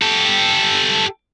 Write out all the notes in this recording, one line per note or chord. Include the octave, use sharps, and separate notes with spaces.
G4 A4